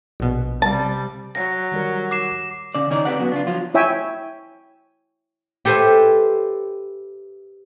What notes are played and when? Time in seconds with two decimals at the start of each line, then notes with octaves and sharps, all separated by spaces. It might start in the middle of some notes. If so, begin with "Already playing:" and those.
0.20 A#1 B2
0.62 C3 G3 A5
1.35 F#3 A#6
1.72 D#3 G3 A#4
2.11 D6 C7 E7
2.75 C#3 D5
2.90 D#3 C#4 D#4 D5
3.05 C4 C#4 G4 B4 D5 F#5
3.18 C#3 F#3 B3
3.32 D4 F4
3.47 F3 F#3 F4
3.74 E4 C#5 E5 G5 G#5
5.65 G4 A4 B4 C5 E5 G#5